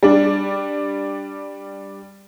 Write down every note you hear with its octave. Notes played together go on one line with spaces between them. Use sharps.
G3 D4